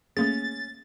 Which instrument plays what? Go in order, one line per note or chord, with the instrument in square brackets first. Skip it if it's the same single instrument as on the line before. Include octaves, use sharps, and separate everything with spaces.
[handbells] A3 A#3 G#4 [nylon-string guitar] C#4 [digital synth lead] A6